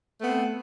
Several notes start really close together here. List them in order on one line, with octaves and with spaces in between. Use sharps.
A3 B3 C4